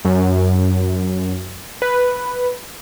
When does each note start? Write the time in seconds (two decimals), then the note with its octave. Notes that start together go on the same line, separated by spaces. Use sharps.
0.05 F#2
1.82 B4